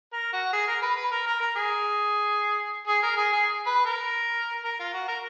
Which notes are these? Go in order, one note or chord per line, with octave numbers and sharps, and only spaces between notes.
A#4
F#4
G#4
A#4
B4
B4
A#4
A#4
A#4
G#4
G#4
A#4
G#4
G#4
B4
A#4
A#4
F4
F#4
A#4